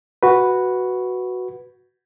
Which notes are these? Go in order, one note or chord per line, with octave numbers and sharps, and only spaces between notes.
F#4 B4